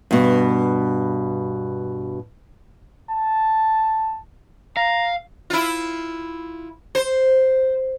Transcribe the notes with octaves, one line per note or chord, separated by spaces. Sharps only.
G2 B2
A5
F5 A#5
E4 F4
C5